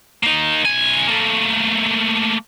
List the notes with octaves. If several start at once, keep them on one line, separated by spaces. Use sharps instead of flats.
A#3 D#4
B1 G#5
A3 A#3